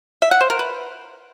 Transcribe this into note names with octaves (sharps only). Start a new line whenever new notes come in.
E5
F#5
C5
A#4
B4